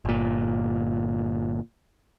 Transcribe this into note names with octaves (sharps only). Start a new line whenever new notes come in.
G1 A#2